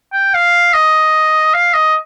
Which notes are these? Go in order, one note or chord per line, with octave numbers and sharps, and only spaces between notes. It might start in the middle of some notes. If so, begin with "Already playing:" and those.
G5
F5
D#5
F5
D#5